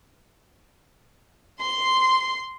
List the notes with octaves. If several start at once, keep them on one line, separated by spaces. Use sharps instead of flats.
C6